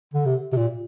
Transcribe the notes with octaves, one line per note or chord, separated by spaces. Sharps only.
D3
C3
C3
A#2